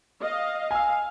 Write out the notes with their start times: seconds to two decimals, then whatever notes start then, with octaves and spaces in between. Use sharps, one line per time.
0.20 D#5 F5
0.71 F5 G#5 E6